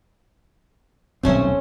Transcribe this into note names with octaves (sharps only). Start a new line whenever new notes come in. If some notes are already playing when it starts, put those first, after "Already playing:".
D#1 B1 A3 C4 C#4 C5